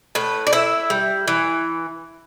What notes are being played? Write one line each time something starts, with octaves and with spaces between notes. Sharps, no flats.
A2 B4
D5
E4 E5
G3
E3